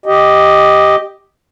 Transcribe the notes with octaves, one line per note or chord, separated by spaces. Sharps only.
G4 D#5